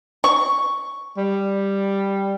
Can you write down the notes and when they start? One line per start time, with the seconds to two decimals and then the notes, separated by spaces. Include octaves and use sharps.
0.24 C#6
1.17 G3